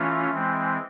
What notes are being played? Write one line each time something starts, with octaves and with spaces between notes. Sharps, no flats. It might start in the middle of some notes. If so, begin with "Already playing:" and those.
Already playing: E3 A3 C#4 F4
E3 G#3 C4